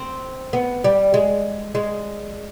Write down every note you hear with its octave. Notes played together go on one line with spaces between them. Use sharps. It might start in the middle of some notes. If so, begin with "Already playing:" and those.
Already playing: C4
B3
G3
G#3
G#3